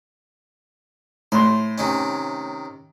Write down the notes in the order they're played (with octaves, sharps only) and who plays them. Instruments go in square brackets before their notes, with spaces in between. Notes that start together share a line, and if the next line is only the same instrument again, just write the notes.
[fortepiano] A2 C6 [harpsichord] C5
[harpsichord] C3 D#3 C#4